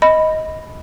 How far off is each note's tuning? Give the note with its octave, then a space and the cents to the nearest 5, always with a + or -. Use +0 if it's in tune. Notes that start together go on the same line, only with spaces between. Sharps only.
D#5 +15 B5 +0